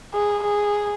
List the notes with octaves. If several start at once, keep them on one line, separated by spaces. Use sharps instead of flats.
G#4
G#4